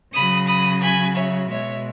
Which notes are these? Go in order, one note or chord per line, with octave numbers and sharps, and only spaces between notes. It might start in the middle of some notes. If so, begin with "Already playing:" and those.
C#3 F#3 B5 D#6
B5 D#6
G#5 B5
C#5 E5
B2 G#3 C#5 E5